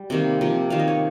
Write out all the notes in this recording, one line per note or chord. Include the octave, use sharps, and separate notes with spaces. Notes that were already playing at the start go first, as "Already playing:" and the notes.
Already playing: G3
C3 D#3 A#3
C3 F3 A#3
C3 D#3 A#3 F5
D#5
C#5